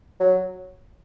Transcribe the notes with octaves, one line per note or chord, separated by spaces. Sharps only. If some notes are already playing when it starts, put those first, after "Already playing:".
F#3